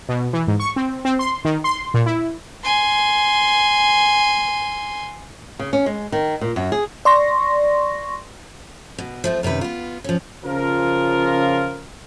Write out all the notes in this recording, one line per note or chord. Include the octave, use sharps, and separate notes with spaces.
B2
E3
G#2
C#6
C4
C4
C6
D#3
C6
A#2
E4
G#5 C6
C#3
C#4
G#3
D#3
A#2
F#2
G#4
D5 C6 C#6 A#6
B2
F3 A3 C4
F#2 C3 D#3 B4
B3 F4
F3 C#4
C#3 F3 F4 A#4